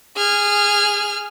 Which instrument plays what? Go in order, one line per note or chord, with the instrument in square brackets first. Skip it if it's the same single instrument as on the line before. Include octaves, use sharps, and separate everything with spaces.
[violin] G#4 F6